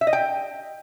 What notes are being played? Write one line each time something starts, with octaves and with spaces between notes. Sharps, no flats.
E5
D#5
G5